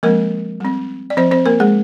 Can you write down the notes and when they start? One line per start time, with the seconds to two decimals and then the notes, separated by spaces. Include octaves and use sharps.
0.03 F3 G#3 A#3 C4 A#4
0.60 G3 C4
1.10 D5
1.17 F3 C4 C5
1.31 C4 C5
1.46 A#3 A#4
1.60 G#3 G#4